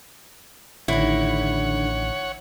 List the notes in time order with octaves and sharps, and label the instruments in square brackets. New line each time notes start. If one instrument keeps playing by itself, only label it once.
[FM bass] A1 [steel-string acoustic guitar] D3 D#3 [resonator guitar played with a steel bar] E4 [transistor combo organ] C#5 F#5